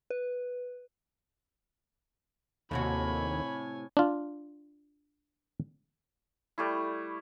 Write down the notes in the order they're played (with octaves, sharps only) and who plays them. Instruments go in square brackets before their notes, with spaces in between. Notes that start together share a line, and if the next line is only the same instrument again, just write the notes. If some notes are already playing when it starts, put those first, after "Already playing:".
[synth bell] B4
[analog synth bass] D#2 [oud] A2 C3 F#4 [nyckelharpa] C#5 G#5 [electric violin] B5
[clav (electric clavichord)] D4 F4
[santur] G3 A3 E4